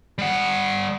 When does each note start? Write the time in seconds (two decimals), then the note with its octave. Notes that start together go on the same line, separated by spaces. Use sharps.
0.18 G3 F#5